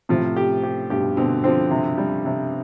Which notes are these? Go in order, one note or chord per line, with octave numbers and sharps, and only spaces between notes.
A2 C3 F3
G4
G4
G2 B2 G4
B2 D3 C4
D3 F3 C4
C3
G3
C3